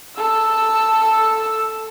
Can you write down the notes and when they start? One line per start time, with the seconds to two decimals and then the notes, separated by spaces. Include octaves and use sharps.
0.16 A4 E6